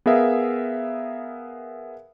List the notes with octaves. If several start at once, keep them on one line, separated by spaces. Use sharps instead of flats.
B3 G#4 A#4 E5 F5